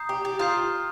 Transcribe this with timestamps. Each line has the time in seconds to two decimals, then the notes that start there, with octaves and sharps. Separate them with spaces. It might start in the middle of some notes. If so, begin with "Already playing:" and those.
Already playing: A#5 D#6 G6 C7
0.09 G4
0.25 G4
0.39 F4 A#5 D#6 G6 C7